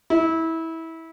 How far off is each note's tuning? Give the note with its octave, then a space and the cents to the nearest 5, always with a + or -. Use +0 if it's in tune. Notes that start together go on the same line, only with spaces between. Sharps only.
E4 -20